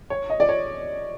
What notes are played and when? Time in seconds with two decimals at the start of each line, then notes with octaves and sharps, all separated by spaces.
0.10 C#5
0.30 D#5
0.40 D5
0.49 C#5